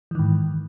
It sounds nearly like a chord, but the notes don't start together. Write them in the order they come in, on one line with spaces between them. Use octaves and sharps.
E3 D#3 G#2